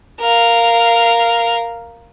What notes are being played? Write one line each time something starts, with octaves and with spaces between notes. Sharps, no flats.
A#4 F5